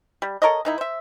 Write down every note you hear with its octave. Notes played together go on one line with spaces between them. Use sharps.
G3
A4 A#4 C#5 D#5
D#3 D#4 E4
C5 E5